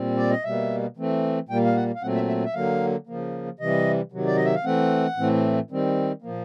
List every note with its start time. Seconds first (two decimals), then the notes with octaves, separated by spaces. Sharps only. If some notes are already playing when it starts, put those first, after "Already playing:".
Already playing: A#2 G3 C4
0.17 D5
0.30 D#5
0.44 B2 G3 A#3 E5
0.97 E3 A3 C4
1.49 A#2 G3 A#3 G5
1.65 F5
1.76 F#5
1.95 F5
2.02 A#2 F#3 A3 C4 F#5
2.15 E5
2.28 E5
2.45 E5
2.54 D3 F#3 A#3 F5
3.07 C#3 F3 A#3
3.59 C3 E3 G3 D#5
4.12 C3 D#3 F#3
4.26 D5
4.36 D#5
4.45 E5
4.55 F5
4.64 E3 A3 C4 F#5
5.17 A2 E3 A3 C4
5.71 D#3 G3 C4
6.22 A#2 F3 A#3